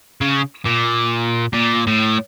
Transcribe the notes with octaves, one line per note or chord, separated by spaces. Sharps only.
C#3
A#2
A#2
A2